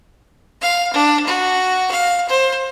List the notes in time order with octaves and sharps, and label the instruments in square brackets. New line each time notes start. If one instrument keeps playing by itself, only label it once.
[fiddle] F5
D4
F#4
F5
C5